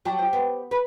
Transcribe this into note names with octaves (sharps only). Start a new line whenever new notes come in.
F#3 G4 A5
G4 C5
B3
B4